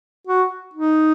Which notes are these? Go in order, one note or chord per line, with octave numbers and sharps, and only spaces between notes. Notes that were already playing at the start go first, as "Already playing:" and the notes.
F#4
D#4